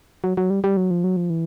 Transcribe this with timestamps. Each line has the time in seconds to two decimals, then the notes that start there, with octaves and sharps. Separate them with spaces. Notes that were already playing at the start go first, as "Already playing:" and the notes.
0.24 F#3
0.37 F#3
0.50 G3
0.64 G3
0.77 F#3
0.91 F3
1.04 F#3
1.16 F3
1.30 E3